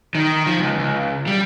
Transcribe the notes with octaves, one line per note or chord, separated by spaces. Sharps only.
D#3
F3
C#2
C#2
G3